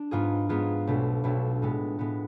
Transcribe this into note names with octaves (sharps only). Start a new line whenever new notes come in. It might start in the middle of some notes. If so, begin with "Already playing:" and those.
Already playing: D4
G#2 G#3 B3 F4 G#4
G#2 G#3 B3 F4 G#4
B1 B2 A3 D4
B1 B2 A3 D4
A2 G#3 B3
A2 G#3 B3